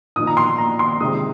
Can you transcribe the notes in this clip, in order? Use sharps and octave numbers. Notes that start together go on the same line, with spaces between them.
A#2 F3 A#3 D#4 D#6
A#5
C6
A#5
C6
C3 D#3 G#3 D#6